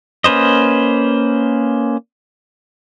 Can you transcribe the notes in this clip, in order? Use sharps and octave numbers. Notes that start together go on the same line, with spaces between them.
A#3 C#4 B4 C5 D#5